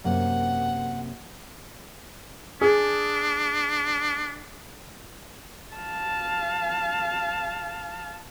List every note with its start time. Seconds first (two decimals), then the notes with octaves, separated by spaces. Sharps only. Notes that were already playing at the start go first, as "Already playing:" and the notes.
0.04 F#2 C3 A#3 F#5
2.61 D4 G#4
5.75 F5 A5